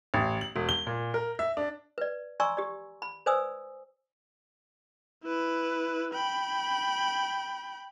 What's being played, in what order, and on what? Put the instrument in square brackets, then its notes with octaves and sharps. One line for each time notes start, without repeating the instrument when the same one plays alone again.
[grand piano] A1
F#7
E1
G7
A#2
A#4
E5
D4
[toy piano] B4 D5
D5 G#5 A#5 C6 C#6 E6
G4 D5
B5
B4 C5 D5 G#5 D#6 E6
[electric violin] E4 B4
G5 B5